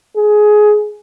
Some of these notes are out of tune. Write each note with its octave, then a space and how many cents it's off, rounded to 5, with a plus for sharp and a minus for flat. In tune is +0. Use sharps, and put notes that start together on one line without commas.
G#4 +15